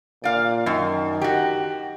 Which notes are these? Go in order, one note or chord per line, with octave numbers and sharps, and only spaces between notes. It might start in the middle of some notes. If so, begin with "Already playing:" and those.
A#2 D5 F5
F#2 D#3
F#4 G4